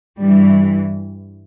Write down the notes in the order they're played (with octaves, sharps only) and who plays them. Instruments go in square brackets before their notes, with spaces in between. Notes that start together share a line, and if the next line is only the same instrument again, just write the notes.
[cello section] G2 E3 G3